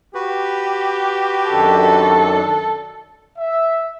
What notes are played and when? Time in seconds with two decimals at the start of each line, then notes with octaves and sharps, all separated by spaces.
0.15 F#4 G4 B4
1.50 F#2 D#3 D4 A4
3.38 E5